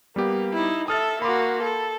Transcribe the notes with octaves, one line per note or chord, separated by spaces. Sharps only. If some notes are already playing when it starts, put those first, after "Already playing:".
G3 A#3 B3 G4
D#4 E4
A4 E5 D#6 F6 A6
A#3 F#4 B5 C6 D6
A4